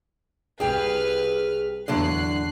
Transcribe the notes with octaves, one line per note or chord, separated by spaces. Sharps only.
C2 G#4 B4 G5 F6
E2 A2 D3 F#3 F#6 C7